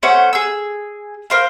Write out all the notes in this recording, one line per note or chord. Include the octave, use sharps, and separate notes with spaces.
A3 C#4 C5 F#5
G#4 E6
A#4 C5 F5